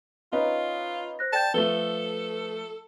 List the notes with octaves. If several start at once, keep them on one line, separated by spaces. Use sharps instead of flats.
C#4 D#4 F4 B4
C5 F#6 A#6
D5 G5 A5 G6
F3 A3 A4 B4 G7